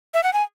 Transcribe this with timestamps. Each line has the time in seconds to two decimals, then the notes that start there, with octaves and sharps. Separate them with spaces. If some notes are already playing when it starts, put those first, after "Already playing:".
0.14 E5
0.24 F#5
0.33 G#5